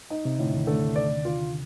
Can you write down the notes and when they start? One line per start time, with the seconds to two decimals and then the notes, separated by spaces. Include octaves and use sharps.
0.10 D#4
0.25 C3
0.39 A2 D3
0.53 D#2 D#3
0.67 D3 A3
0.96 D5
1.25 F4